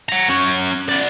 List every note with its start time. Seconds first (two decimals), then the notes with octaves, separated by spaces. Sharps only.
0.09 F#5 A#5
0.29 C#4 F#4
0.89 B3 D5